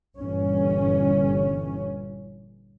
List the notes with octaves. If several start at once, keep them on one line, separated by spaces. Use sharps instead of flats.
G1 G2 A#2 E3 C#4